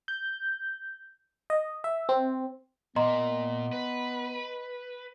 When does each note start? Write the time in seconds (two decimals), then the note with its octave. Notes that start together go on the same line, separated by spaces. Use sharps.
0.08 G6
1.50 D#5
1.84 E5
2.09 C4
2.96 A#2 A#3 B3 D#5 A#5 C6
3.73 B4